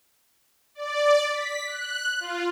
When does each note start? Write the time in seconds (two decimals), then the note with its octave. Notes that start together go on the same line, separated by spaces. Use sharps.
0.75 D5
1.31 B6
1.66 F#6
2.20 F4